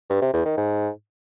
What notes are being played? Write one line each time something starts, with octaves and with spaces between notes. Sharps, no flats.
G2
C3
E2
D#3
G#2